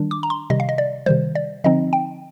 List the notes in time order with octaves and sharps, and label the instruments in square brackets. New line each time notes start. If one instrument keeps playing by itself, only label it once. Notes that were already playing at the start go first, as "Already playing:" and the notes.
Already playing: [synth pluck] D#3 G3 D4
D6
A#5
C6
C3 D#3 G3 D#5
F5
D#5
D5
C3 D#3 G3 C5
D5
D3 F3 C4 D#4 D#5
G5